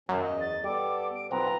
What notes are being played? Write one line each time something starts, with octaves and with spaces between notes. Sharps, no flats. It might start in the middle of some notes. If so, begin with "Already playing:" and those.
F#2 B2 D#3 C#4
E2 D#5 F5
A6
G3 B3 A4 D6
D7
B1 C4 F4 B4 F#5 A#5